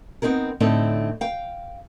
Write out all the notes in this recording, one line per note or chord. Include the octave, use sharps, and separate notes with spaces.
B3 C4 D#4 G#4 A#4
A2 D3 C4 D#4 A4
F5 G5